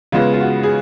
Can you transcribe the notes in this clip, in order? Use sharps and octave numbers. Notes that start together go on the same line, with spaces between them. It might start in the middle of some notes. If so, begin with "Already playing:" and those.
C#3 G#3 B3 F4
F4
F#4
G#4